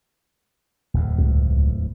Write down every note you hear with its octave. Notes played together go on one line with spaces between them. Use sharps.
D1 E2 A2
C#2